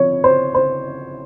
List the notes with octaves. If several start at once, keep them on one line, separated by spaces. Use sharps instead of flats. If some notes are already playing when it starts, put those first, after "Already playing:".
Already playing: F3 C4 C#5
C5
C5